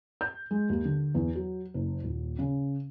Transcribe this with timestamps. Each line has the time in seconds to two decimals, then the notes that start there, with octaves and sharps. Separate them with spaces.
0.21 G6
0.51 G#3
0.69 D#2
0.85 D3
1.15 E2
1.35 F#3
1.74 F#1
2.04 D#1
2.39 C#3